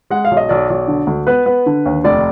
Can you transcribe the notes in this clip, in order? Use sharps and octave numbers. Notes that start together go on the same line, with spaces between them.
G#3 F#5
F5
B1
D#5
B1 D5
B1
D3
D2
B3 B4
B3
D3
D#2
F1 D5